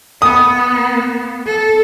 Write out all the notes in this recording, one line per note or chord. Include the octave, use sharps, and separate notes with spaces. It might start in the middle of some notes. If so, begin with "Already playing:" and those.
B3 D#6
A4